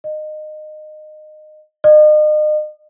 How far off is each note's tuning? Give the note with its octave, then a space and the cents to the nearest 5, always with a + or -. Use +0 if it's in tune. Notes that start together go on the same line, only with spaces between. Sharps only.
D#5 -20
D#5 -40